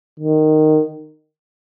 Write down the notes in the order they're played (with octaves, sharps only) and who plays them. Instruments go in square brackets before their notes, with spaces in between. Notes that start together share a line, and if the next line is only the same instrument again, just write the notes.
[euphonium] D#3